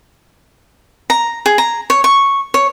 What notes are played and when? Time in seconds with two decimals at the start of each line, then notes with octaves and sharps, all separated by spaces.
1.10 A#5
1.46 G#4
1.58 A#5
1.90 C#5
2.04 C#6
2.54 C#5